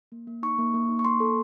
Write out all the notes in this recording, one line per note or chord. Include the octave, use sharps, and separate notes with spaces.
A#3
A#3
D#4 C#6
A#3
A#3
D#4
C#6
A#3 C6
A4